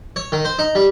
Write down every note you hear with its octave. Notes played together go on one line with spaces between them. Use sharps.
C#5
D#3
C5
D#4
G3